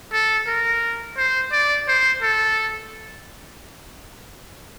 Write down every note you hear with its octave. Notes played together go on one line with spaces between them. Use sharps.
A4
A#4
C5
D5
C5
A4